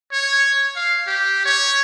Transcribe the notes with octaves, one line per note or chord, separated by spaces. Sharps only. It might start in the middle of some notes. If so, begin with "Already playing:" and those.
C#5
F5
G4
C#5